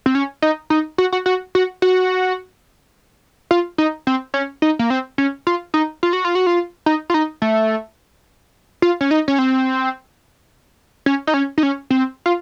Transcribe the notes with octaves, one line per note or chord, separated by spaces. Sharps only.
C4
C#4
D#4
D#4
F#4
F#4
F#4
F#4
F#4
F4
D#4
C4
C#4
D#4
A#3
C4
C#4
F4
D#4
F4
F#4
F4
F#4
F4
D#4
F4
D#4
A3
F4
C#4
D#4
C#4
C4
C#4
D#4
C#4
D#4
C#4
C4
F4